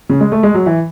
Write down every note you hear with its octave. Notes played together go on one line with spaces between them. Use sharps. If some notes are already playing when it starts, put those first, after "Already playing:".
C#3
G#3
A3
G#3
F#3
E3